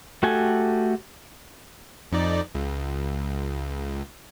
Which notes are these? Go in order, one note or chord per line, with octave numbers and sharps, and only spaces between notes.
A3 F#4 G4 A4 G#5
F2 D#4 D5
C#2